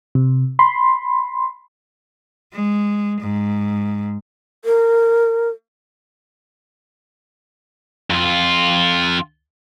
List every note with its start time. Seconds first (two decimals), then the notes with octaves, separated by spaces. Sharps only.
0.15 C3
0.59 B5 C6
2.53 G#3
3.21 G#2
4.65 A#4
8.10 F2 F4